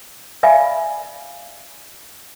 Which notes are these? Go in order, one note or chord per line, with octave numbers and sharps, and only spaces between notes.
D5 E5 F5 G#5 B5